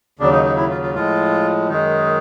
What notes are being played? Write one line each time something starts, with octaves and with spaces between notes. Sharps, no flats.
D#2 C#3 F#3 D4
D#4
D#4
E4
F4
F4
A2 F3 G#3 F4
F#2 D#3 G#3 D#4